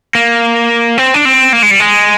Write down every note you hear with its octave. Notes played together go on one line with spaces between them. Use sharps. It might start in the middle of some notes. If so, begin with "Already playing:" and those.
A#3
C4
D4
C4
A#3
G#3
G3
G#3